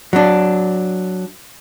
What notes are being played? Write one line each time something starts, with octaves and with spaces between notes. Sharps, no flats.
F#3 D4